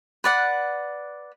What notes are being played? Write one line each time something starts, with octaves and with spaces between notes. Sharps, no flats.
B4 D5 F#5